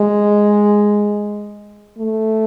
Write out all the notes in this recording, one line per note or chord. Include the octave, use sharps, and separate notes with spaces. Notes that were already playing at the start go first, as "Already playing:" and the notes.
Already playing: G#3
A3